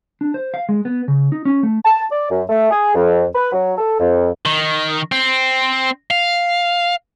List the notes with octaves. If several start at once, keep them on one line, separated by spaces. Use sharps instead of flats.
D4
C5
F5
G#3
B3
C#3
D#4
C#4
A3
A5
D5
F#2
A3
G#4
F2
B4
F#3
A4
F2
D#3
C4
F5